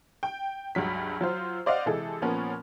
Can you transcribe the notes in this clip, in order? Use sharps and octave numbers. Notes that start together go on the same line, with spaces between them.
G5
C#2 G2 F#3 B6
F#3 F4 C5
C5 D5 D#5 F5 F#5
C3 E3 G#3 G#4 A4
A#2 F3 B3 C#4 A#4